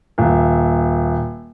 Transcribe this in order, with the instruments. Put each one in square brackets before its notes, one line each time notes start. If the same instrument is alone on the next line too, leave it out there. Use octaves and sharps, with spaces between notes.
[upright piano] D#1